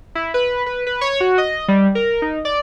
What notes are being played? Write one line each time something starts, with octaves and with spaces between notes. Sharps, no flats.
E4
B4
B4
B4
C#5
F#4
D#5
G3
A#4
D#4
D5